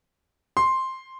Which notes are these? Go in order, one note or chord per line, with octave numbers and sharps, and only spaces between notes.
C6